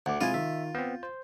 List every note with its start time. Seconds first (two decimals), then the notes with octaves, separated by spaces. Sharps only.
0.06 D2 F#5 D6
0.21 C3 G#3 E4 F4 G#4 G#5
0.34 D#3 E5
0.75 B3 C4 G6
1.03 C5